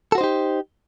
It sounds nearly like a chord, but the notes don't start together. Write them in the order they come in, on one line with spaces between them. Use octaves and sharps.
A4 F#4 C5 D#4 G4